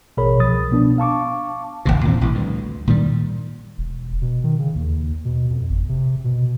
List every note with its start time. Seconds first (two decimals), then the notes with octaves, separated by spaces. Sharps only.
0.17 A1 B2 G#4 A#4 C#5 B5
0.40 C2 F3 D#6 A6
0.71 B2 B3 D4
0.98 F5 A5 C#6 D6
1.85 D#1 G#1 D#2 C3
2.05 A#2 E3 C4
2.21 A1 D#3 E3
2.34 D2 G2
2.87 A#2 D#3 G3
3.78 E1
4.22 B2
4.44 D#3
4.59 C#3
4.75 D#2
5.25 B2
5.50 F2
5.70 G1
5.89 C3
6.24 B2